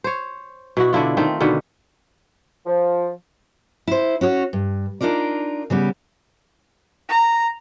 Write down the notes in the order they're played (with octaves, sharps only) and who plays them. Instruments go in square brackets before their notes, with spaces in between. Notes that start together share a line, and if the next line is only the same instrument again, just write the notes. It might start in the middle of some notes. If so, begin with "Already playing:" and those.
[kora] C5 C#5
B2 E4 F#4
D3 D4 E4 F4
D#3 A3 C4
B2 D3 D#3 B3
[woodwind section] F3
[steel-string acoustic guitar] E4 C5
C#4 F#4 C#5
G2
D4 D#4 F4 A#4 D5
C#3 G3 B3 G4
[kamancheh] A#5